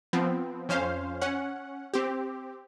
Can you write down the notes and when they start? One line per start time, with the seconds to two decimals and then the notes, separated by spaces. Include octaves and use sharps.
0.13 F3 B3 C4
0.69 F2 C#4 C5 F5
1.22 C#4 F#5
1.94 C4 G4